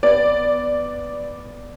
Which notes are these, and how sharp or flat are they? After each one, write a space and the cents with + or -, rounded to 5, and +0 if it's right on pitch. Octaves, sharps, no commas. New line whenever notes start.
B3 +0 D5 +0